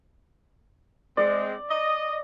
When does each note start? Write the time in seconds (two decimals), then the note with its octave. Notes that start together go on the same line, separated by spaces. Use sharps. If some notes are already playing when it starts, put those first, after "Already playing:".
1.17 G#3 C4 D5
1.70 D#5